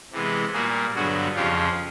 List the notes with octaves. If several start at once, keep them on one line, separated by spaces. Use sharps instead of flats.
C3 E3 G#3 B3
A#2 G3 A#3 F#4 G#4
G2 D3 F#3 B3 F#4 G#4
F2 C#3 F3 F4 G4